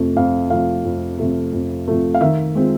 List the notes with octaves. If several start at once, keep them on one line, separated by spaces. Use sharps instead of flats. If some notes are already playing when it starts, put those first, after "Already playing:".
Already playing: F2 C3 F3 A3
F2 F5
C3 F3 A3 F5
F2
C3 F3 A3
F2
C3 F3 A3
F5
D#3 E5
G#3 C4 F4